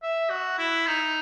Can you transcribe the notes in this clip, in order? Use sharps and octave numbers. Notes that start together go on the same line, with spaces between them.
E5
F#4
E4
D#4